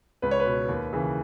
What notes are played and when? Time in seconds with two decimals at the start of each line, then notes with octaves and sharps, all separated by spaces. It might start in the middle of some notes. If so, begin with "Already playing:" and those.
0.22 C#2 B4
0.31 C#5
0.40 B4
0.46 B2
0.68 D#2
0.93 C#3 E3